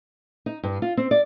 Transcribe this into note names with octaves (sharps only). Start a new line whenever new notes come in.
D#4
G2
F4
C4
D5